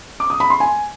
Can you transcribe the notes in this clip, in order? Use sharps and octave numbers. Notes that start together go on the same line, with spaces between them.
D6
D#6
B5
C6
G#5